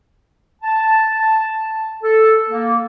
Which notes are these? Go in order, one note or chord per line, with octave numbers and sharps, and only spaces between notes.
A5
A4
A#3